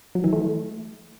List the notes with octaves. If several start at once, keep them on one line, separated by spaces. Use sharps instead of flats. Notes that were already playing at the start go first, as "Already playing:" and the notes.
F#3
E3
A3